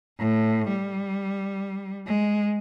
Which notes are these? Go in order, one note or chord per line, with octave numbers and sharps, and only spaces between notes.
A2
G3
G#3